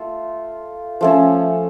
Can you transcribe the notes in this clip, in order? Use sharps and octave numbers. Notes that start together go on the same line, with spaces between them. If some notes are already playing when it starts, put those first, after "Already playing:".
Already playing: A3 F4
F3 A3 C#4